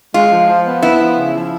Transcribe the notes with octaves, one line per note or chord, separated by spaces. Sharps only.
G#3 F4
F3
F3
B3
B3 E4
F3
C#3
F3